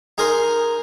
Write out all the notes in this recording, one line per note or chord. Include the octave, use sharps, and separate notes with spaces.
D#4 G#4 A#4 C5